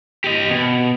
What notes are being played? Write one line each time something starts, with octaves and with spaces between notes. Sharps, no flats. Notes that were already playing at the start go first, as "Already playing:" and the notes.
G4 D#5
B2